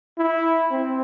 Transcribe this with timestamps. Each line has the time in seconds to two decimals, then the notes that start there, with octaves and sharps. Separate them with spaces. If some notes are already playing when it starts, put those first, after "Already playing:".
0.18 E4
0.71 C4